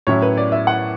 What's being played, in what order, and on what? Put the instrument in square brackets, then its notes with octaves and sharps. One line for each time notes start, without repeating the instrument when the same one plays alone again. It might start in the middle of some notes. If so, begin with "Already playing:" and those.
[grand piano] A2 F#3 C#4 E4 C#5
B4
D5
E5
F#5